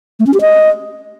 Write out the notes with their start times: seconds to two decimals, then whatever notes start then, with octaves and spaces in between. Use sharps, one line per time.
0.20 A3
0.27 C#4
0.34 G4
0.41 D#5